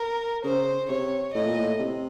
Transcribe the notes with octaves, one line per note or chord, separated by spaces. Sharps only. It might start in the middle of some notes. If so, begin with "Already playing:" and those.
Already playing: A#4
C#3 C5
C3 C#5
A2 D#5
A#2
A2
C3